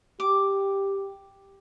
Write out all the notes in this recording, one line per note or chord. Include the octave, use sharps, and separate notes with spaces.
G4 D6